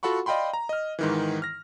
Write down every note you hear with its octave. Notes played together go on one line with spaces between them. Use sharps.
F4 F#4 A4 F#5 B5 C#6
D5 D#5 F5 G5 B5 C6
A#5
D#5 F6
G#2 D#3 E3
F6 A#6